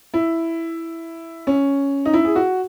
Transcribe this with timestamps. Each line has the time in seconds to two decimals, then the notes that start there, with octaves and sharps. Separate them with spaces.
0.14 E4
1.47 C#4
2.05 D#4
2.14 E4
2.25 G#4
2.36 F#4